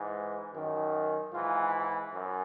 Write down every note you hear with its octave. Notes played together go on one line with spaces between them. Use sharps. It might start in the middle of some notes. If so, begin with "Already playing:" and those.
Already playing: G#2 E3
F#2 D#3
G#2 E3 F4
F#2